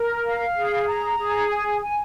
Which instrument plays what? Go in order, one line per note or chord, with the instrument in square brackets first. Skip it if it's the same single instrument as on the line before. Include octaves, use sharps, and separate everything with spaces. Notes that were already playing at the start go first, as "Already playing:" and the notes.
Already playing: [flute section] A#4
F5
G#4
A#5
G#4
G#5
G#5